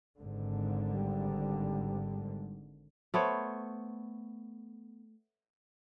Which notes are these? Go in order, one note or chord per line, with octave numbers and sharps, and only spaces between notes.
G#1 G#2 D3
G3
A3 B3 C5 C#5